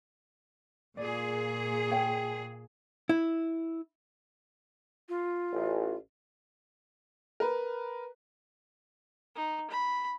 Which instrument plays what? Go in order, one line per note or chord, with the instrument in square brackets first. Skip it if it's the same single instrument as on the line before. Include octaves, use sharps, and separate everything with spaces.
[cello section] A#2 G#4 [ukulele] D5
[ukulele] C#5 F5 G5
[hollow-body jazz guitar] E4
[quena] F4
[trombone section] A1
[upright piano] A#4 B4
[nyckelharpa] D#4
B5